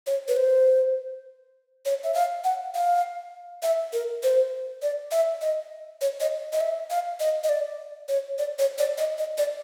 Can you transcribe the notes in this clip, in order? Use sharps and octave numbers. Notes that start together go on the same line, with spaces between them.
C#5
B4
C5
C#5
E5
F5
F#5
F5
E5
A#4
C5
D5
E5
D#5
C#5
D#5
D#5
E5
F5
D#5
D#5
D5
C#5
D5
C#5
D5
D#5
D#5
D5